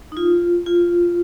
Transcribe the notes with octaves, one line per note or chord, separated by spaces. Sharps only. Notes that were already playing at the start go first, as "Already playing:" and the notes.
D#4
F4
F4